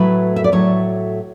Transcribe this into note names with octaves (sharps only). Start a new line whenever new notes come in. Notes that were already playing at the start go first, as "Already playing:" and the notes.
Already playing: A2 F#3 A3 B4
E5
D5
A2 F#3 A3 C#5